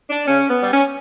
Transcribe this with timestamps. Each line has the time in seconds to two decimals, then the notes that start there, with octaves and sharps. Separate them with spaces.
0.09 D4
0.26 C#3 C#4
0.49 B3
0.61 G3
0.72 C#4